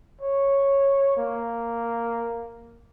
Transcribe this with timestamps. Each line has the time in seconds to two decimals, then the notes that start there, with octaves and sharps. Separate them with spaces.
0.21 C#5
1.17 A#3